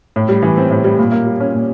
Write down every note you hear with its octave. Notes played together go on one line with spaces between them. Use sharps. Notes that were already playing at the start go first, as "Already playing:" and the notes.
A2
G3
E3
C4
A2
G3
A#2
A#3
G3
C#4
A#2